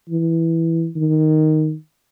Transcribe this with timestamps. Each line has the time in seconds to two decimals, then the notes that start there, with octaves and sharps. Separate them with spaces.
0.10 E3
0.96 D#3